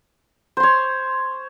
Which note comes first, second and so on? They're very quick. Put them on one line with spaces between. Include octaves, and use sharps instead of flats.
C5 C6 C#5